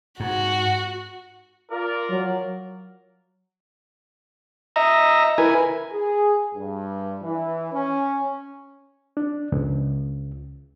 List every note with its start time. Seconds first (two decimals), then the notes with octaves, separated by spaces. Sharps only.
0.20 G#2 F#4
1.71 F4 A#4 D5
2.09 F#3
4.76 D#5 E5 A#5
5.38 E4 A#4 B4 G#5
5.93 G#4
6.54 G2
7.22 E3
7.73 C#4
9.17 D4
9.52 C#2